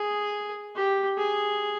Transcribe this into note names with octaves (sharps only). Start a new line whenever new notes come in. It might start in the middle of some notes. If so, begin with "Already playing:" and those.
Already playing: G#4
G4
G#4